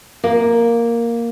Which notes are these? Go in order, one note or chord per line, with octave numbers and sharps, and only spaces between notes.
A#3